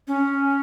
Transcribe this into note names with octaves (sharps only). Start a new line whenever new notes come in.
C#4